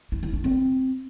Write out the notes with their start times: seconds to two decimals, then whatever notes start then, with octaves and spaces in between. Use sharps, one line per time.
0.12 E4
0.23 E4
0.33 D4
0.44 C4